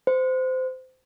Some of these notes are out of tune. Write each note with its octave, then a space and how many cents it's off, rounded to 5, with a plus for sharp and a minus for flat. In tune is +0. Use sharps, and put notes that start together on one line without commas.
C5 -20